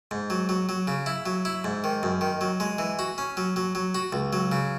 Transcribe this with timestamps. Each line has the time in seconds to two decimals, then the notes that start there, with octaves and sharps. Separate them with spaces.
0.11 G#2
0.30 F#3
0.49 F#3
0.69 F#3
0.88 C#3
1.06 E4
1.26 F#3
1.45 E4
1.64 G#2
1.84 D#3
2.03 F#2
2.21 D#3
2.41 F#3
2.60 G#3
2.78 E3
2.99 F#4
3.18 C#4
3.37 F#3
3.56 F#3
3.75 F#3
3.95 F#4
4.13 C#2
4.33 F#3
4.52 C#3